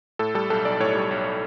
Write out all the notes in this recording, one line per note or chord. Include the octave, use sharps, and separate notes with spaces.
A2 A4
G3 A4
B1 A4
B1 D5
A2 C#5
G3
B1